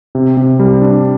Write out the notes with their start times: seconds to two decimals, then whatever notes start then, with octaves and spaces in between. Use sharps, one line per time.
0.15 C3
0.37 C3
0.60 G3
0.82 D4